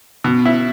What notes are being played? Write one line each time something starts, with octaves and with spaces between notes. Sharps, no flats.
B2
E4